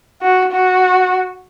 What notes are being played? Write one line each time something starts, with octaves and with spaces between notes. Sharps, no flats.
F#4
F#4